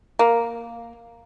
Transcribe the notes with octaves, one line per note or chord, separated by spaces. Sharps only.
A#3